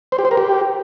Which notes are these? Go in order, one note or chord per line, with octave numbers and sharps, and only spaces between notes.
C5
G4
C5
A#4
G4